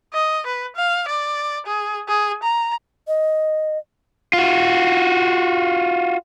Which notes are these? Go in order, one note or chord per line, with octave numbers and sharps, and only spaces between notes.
D#5
B4
F5
D5
G#4
G#4
A#5
D#5
F4 F#4